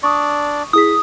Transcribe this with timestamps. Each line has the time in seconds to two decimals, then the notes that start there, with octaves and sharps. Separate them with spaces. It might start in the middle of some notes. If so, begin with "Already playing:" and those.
0.03 D4 D5 C#6 D#6
0.73 E4 G#4 D#6 B6